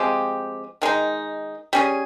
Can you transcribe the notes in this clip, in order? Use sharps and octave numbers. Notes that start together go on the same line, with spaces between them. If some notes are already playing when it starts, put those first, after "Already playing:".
Already playing: F3 G#3 C4 G4
D#3 G#3 D#4
G3 C#4 G#4